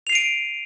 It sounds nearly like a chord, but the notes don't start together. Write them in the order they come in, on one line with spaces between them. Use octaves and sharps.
F7 C7 D#7 D7